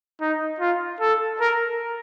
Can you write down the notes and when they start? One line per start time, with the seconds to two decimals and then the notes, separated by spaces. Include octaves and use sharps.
0.21 D#4
0.60 F4
1.00 A4
1.41 A#4